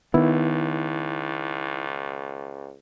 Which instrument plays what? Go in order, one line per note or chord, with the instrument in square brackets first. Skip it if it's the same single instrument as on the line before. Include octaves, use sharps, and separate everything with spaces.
[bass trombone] C#2 [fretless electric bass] D#3 B3 [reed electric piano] E4